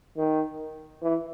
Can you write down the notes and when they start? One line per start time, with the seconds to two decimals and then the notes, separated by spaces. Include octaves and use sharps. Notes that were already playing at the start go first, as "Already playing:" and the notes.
0.17 D#3
1.02 E3